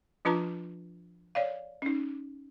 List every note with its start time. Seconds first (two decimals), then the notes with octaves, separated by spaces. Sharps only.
0.25 F3 D4 F4 B4 A5 A#5
1.35 C#5 D5 F5
1.82 C#4 D#4